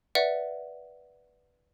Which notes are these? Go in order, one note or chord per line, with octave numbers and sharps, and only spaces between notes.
B4 D5 E5 F#5